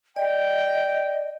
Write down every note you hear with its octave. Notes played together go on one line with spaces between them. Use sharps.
D5 D#5 G5